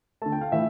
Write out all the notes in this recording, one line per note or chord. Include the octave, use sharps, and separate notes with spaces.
D3 A3 A5
G5
F5
A2 E3 A3 E5